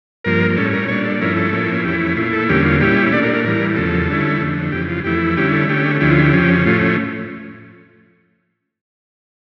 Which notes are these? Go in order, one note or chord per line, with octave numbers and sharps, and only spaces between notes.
G2 F3 A#3 A#4
A2 G3 C#4 A4
A#4
A#2 G3 D4 C#5
A4
G2 F3 A3 C#4 E4 A#4
A4
A2 F3 A#3 C#4 E4
F2 E3 A3 C#4 E4 G4
A#2 A3 E4 F4
A4
E2 D3 G3 A#3 C#4 G4
F4
A#2 G3 C#4 E4 G4
A#2 A3 D4 D5
A#4
A#4
A2 E3 G3 A#4
E2 C#3 F3 A4
D3 G3 C#4 E4
F2 D3 A3
F2 C#3 E3 G4
F4
F2 E3 A3 E4 G4
D3 G3 C#4 E4 G4
A4
D3 A3 C#4 G4
D2 D3 F3 C#4 E4 G4
F4
G4
F2 C#3 F3 C#4
A2 F3 A3 C#4 F4